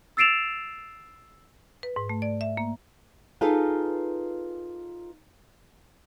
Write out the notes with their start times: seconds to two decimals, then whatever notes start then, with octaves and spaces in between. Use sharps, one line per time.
0.17 E6 A6 C7 D7 E7 F7
1.83 B4
1.96 G#2
2.09 A3
2.22 D5
2.41 E5
2.57 A#3
3.41 D#4 F4 G#4 A4 B4 F5